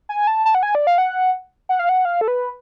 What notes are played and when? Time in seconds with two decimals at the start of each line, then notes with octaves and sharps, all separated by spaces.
0.09 G#5
0.27 A5
0.45 A5
0.55 F#5
0.63 G#5
0.75 D5
0.87 F5
0.98 F#5
1.69 F#5
1.79 F5
1.89 F#5
2.05 F5
2.21 A4
2.28 B4